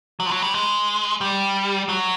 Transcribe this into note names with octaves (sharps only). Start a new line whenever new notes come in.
F#3
F3
F#3
G3
G#3
G3
F#3